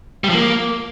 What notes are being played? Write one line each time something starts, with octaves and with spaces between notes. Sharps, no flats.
G3
F3
A#3